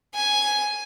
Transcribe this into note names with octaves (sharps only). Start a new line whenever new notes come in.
G#5